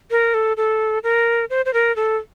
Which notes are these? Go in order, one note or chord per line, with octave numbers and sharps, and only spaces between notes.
A#4
A4
A4
A#4
C5
C5
A#4
A4